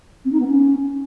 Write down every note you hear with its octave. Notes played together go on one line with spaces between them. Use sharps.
C4
D#4
B3
C#4